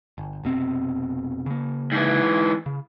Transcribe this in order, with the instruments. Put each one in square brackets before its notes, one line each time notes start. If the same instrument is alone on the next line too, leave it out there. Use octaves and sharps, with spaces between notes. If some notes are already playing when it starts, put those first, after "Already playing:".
[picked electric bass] G1
F1 B2 C4
C#3 A#3
[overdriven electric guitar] G#2 E3
[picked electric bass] C#3